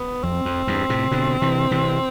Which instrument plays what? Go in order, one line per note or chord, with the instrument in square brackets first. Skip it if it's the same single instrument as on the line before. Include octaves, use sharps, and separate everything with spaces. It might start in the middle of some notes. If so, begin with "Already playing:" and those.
Already playing: [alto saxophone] B3
[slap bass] F2 [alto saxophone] C4
[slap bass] F2
E2 G2
A2 C3
B2 D3
C3 E3
C3 E3